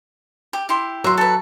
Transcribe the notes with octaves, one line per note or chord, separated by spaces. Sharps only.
G4
E4 G4 C6
F#3 E5 C6
A4 B4